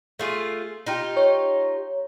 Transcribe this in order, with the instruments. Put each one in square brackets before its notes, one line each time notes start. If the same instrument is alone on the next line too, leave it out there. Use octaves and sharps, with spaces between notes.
[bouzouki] A3 F4 G#4
D#4 F4 G4
[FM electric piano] C#5